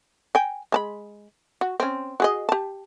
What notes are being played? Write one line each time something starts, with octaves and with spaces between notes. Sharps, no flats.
G5 G#5
G#3 A5 B5
F#4
C4 C#4
F#4 G#4 D#5
G4 A5